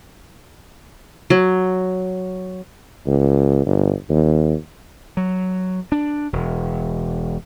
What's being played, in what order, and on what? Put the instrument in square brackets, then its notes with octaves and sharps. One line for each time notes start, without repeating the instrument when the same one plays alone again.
[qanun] F#3
[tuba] C#2
G1
D#2
[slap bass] F#3
D4
E1